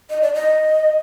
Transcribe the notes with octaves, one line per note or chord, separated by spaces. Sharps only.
D#5
D5
D#5